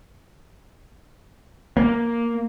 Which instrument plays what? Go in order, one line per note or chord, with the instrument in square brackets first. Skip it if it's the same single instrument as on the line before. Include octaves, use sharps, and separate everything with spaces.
[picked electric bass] A#3